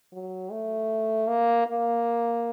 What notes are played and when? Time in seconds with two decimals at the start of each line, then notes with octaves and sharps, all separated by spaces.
0.13 F#3
0.51 A3
1.28 A#3
1.67 A#3